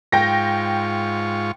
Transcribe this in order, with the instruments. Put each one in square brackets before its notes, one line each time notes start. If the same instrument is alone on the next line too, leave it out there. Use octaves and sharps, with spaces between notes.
[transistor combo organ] G#2 F4 C#6 [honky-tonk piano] G5 A#6